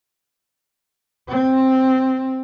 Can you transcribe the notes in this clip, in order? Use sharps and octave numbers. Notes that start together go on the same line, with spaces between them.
C4